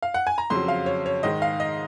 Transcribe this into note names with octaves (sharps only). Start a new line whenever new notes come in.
F5
F#5
G#5
A#5
F2 C#3 F#3 C6
F5
C#5
C#5
G#2 D#3 G#3 D#5
F5
D#5